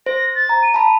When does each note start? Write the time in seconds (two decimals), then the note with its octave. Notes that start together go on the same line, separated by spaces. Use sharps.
0.06 C5 A#6
0.35 A6
0.49 A#5
0.63 D#7
0.74 A5 B5